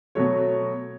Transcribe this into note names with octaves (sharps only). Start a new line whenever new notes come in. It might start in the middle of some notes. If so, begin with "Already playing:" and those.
B2 F#3 A3 C#5